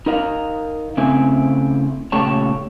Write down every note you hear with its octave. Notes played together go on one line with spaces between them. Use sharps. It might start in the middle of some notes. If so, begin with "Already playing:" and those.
D#4 A#4 D#5 F5
C#3 A3 C4 E4 G#5
A#2 C#3 A3 G4 C#5 A5